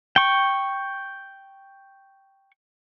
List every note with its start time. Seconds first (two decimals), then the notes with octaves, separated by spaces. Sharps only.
0.16 G5 C#6